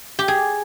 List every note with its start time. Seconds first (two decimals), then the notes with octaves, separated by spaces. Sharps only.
0.19 G4
0.28 G#4